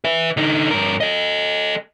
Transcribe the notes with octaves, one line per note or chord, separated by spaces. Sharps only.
B4 E5
D3 D#4
G2 A#4
A4 D#5